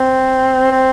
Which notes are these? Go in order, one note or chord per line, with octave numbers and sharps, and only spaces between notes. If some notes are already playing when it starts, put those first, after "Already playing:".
Already playing: C4
C4